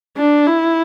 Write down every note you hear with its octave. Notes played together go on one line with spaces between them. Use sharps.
D4
E4